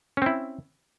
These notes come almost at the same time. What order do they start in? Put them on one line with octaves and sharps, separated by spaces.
C#4 C4 E4